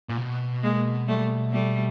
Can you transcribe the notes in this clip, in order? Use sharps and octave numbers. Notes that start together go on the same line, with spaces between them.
A#2
B2
G#3 A#3
G3 A3
G3 A3